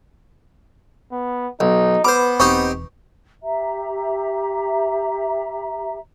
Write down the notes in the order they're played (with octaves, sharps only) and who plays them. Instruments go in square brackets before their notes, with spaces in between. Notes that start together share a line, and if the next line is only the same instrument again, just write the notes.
[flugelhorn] B3
[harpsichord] B1 [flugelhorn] D#4
[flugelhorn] B3 [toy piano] B4 B5 [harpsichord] C5 D6
[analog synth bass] E1 [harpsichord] C4 D#4 G4 [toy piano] C#6
[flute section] G4 E5 A#5